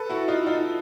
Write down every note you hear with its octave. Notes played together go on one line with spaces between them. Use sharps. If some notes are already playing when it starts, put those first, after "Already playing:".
Already playing: A4 B4
E4 F#4
D#4 F4
D#4 F4